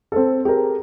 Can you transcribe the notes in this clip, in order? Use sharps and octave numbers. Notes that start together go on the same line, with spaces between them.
C4 A4
G4 G#4 A#4